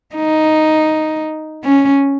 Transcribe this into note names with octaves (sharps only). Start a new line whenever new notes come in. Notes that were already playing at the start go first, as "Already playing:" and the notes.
D#4
C#4